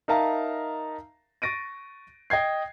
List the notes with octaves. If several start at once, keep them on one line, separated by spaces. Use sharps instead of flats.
D#4 A#4 E5 F5 A5 A#5
C#6 A6 A#6 D7 D#7
D#5 G5 G#6 C7